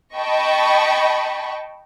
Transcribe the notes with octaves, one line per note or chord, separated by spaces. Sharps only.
D#5 G5 A5 B5 C#6